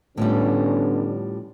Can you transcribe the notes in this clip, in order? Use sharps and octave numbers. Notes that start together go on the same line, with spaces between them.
A2 D3 F3 G3 B3 C#4